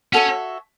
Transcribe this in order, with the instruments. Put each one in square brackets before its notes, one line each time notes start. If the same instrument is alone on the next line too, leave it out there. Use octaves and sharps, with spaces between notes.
[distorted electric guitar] C#4 [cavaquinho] F#4 A4 C#5 E5